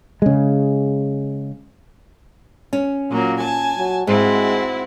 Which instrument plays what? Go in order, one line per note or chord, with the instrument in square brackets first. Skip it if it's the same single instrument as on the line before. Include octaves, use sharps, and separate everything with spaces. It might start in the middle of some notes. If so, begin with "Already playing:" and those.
[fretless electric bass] C#3 G#3
[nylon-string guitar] C#4
[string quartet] A#2 F#3 A#3
G#5 A5
[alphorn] F#3
[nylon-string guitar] G#2 [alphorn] G#3 [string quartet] C4 E4 F#4